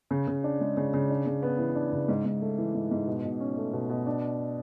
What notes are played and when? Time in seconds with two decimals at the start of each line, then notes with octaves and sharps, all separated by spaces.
0.11 C#3
0.27 C#3
0.44 D4
0.61 G#3
0.77 C#3
0.94 C#3
1.10 D4
1.26 C#3
1.43 B3
1.59 E3
1.76 D4
1.92 C#3
2.08 G#2
2.25 G#2
2.41 A3
2.58 E3
2.74 G#2
2.91 G#2
3.08 B2
3.24 B2
3.40 C#4
3.57 A3
3.73 B2
3.89 B2
4.07 D4